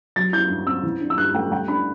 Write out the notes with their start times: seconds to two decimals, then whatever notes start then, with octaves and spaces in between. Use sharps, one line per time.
0.16 F#3 A6
0.33 E4 G6
0.49 G2
0.67 C4 E6
0.83 E3
1.01 D4
1.10 E6
1.18 G2 F#6
1.34 A3 G5
1.52 G3 G5
1.68 D4 B5